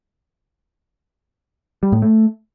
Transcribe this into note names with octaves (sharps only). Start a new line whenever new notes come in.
G3
A2
A3